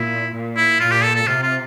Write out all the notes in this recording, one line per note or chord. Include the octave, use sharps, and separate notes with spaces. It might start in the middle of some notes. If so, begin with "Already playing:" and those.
Already playing: A#2 E4
A#2
E4
A#2 F4
G4
A4
A4
C3 F4
F4